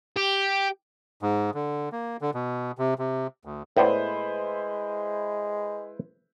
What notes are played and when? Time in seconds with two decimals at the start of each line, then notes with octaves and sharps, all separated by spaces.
0.17 G4
1.22 G#2
1.54 D3
1.92 A#3
2.21 D3
2.34 B2
2.78 C3
2.99 C3
3.45 D2
3.77 A2 G#3 B3 E4 B4 C5 D5